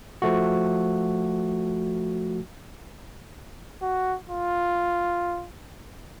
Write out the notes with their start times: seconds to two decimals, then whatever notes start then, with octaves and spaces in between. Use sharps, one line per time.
0.22 F3 A3 F#4
3.82 F#4
4.29 F4